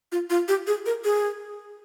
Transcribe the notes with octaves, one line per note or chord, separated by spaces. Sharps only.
F4
F4
G4
G#4
A#4
G#4